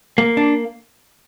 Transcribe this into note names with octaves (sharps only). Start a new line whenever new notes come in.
A#3
D4